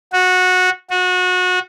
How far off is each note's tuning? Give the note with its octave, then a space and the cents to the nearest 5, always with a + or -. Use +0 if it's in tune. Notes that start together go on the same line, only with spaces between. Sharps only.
F#4 -15
F#4 -25